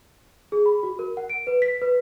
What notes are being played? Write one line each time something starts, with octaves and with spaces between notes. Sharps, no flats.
G#4
B5
F#4
A#4
F#5
D7
B4
B6
B4